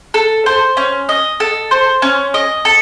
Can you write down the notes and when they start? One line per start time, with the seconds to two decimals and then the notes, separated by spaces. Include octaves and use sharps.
0.14 A4
0.46 C5
0.77 C#4
1.09 D#5
1.40 A4
1.71 C5
2.02 C#4
2.34 D#5
2.65 A4